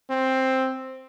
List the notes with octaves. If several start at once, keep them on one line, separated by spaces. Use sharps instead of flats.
C4